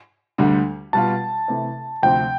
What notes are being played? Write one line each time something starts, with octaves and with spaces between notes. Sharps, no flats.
D2 D3 G3
B2 G3 B3 F4 A5
C3 E3 A3 E4
D2 C3 F3 C4 G5